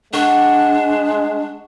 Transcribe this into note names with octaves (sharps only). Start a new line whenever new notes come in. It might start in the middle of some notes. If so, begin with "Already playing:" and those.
G#3 D4 F#5 C#6